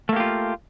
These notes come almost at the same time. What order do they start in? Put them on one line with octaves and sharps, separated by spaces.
A3 A#3 G4 F4